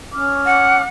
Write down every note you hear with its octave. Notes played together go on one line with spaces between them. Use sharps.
C#4 D6 F6
F#5